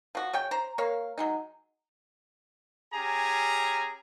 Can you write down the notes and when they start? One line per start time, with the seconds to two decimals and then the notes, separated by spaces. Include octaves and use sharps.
0.15 F3 F#4
0.33 C#3 C#5 G5
0.51 C5 A#5
0.78 A#3 C#5 F5
1.18 F#3 G#3 D#4
2.94 C#4 G4 G#4 G#5 A#5